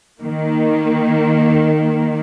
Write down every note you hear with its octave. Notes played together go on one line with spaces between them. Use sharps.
D#3 A#3